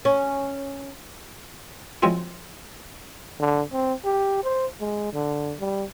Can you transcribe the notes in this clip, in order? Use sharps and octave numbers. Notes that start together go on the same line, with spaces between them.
C#4
F3 F#3 G#3 C4 E4
D3
C4
G4
C5
G#3
D3
G3